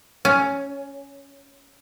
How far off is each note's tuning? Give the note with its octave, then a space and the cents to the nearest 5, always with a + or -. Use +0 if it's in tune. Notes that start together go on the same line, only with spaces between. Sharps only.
C#4 +5